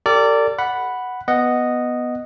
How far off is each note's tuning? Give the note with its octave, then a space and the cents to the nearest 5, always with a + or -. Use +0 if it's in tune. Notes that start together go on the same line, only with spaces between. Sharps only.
G4 +10 A#4 -45 D5 -10
F#5 +0 B5 +0
B3 +0 D#5 -5 F#5 +0